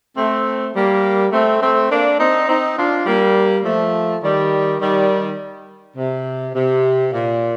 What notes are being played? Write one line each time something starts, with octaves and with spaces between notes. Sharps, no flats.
A3 C4
G3 A#3
A3 C4
A3 C4
A#3 D4
C4 D#4
C4 D#4
D4 F4
G3 A#3
F3 A3
D#3 G3
D#3 G3
C3
C3
A#2